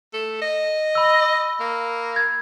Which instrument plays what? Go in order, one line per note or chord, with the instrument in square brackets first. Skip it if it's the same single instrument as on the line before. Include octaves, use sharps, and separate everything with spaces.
[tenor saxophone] A3
D#5
[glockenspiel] B5 E6
[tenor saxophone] A#3
[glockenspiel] G#6